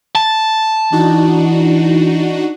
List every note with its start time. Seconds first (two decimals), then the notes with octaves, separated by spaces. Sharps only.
0.15 A5
0.92 E3 D4 D#4 F#4